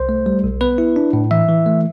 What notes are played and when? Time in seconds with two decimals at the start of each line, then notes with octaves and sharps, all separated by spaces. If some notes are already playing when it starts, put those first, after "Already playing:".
Already playing: C2 C5
0.09 A3
0.26 G3
0.44 B1
0.61 B3 B4
0.78 E4
0.96 D4
1.13 A2
1.31 E3 E5
1.49 E3
1.66 A3